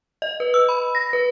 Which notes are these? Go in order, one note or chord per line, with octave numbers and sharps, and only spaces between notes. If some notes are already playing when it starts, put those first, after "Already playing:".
D#5
B4
E6
B5
A#6
B4